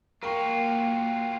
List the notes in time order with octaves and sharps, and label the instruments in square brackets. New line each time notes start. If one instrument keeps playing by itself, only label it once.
[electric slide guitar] F#3 F4 [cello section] A#3 [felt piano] A#4 C#6 [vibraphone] F5 G5